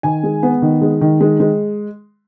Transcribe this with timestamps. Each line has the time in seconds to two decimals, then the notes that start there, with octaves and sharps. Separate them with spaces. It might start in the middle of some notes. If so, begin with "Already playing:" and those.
0.03 D#3 G#5
0.23 G#3
0.43 B3
0.62 D#3
0.81 G#3
1.01 D#3
1.21 G#3
1.40 G#3